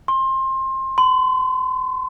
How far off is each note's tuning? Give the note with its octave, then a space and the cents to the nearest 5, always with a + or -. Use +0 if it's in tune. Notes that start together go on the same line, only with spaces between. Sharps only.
C6 +25
C6 -40